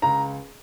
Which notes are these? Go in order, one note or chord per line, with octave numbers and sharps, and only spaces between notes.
C#2 A#5